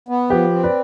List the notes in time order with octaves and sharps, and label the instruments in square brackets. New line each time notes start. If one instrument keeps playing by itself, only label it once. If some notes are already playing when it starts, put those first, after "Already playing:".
[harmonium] B3
[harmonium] F3 [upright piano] G4 B4
[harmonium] C4
[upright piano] B4 D5